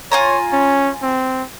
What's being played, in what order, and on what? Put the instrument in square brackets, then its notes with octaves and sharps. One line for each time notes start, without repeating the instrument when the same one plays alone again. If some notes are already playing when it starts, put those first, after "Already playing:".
[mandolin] F4 G#5 A#5 [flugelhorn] C#5
[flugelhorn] C#4
C4